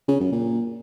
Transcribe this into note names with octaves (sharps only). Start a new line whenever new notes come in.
C#3
F#2
A#2